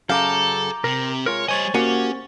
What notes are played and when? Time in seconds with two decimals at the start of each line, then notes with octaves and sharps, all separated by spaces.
0.10 F#2 C#3 A4 F5 A#5 D6 G6
0.84 C3 C4 A#4
1.26 G#3 F4 A#4 C#5
1.48 G3 C5 C#5 D#5 G#5 C#6 A6
1.74 A#3 C#4 F#4 G4 F#5 G#5